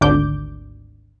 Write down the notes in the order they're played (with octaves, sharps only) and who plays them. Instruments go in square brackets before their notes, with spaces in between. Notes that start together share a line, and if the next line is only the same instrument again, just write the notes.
[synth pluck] G#1 D2 D3 D6 G6